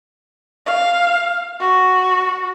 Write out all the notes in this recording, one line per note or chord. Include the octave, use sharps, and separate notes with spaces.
F5
F#4